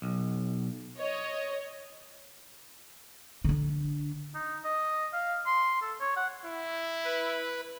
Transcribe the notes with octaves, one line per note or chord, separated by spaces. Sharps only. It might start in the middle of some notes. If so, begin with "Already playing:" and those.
B1
C#5 D#5
D3 D4
D#4
D#5
F5
C6
A4
C#5
F#5
E4
B4